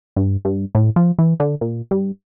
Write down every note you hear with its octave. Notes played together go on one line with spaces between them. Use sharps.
G2
G2
A2
F3
E3
D3
A#2
G2